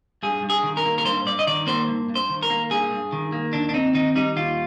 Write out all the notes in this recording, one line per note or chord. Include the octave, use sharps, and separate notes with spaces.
G2 G#4
G2
G#4
D#3
A#4
A#3
A#4
G2 C5
G2 D5
D#5
D#3 D5
A#3 C5
G2
G2
C5
D#3
A#4
A#3
G2 G#4
G2
D#3
A#3
D#2 D4
D4
C4 D#4
D#3 D#4
G3 D#4
D#2 F4